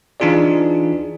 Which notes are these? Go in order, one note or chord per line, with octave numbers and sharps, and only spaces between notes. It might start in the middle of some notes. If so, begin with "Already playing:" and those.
E3 D4 D#4 F4 G#4 D5